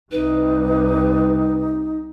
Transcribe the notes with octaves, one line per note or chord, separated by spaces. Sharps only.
C2 C3 G3 D#4 B4